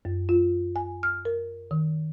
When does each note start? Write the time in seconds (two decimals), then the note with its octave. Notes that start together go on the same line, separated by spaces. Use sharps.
0.05 F#2
0.29 F4
0.76 G#5
1.03 F6
1.25 A#4
1.71 D#3